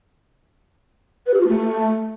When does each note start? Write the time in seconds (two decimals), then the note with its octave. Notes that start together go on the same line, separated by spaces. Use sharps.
1.26 B4
1.33 G4
1.41 F4
1.48 A3